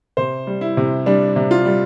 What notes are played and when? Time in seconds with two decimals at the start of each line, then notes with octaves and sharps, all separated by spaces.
0.17 C3 C5
0.47 G3
0.61 E4
0.77 C3
1.06 G3 D4
1.36 C3
1.51 F4
1.65 G3